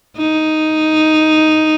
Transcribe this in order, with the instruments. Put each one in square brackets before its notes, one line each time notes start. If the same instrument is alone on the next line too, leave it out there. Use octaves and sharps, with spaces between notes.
[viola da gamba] D#4